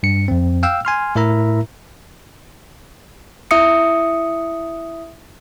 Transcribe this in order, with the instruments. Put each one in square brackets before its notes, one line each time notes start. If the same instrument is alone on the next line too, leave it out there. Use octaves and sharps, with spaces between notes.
[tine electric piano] G2 C#7
F2 C4
F5 G5 E6
G#5 C6 F6
A2 E4 A#4 E5 A#5
[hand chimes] E4 E5 D#6 C#7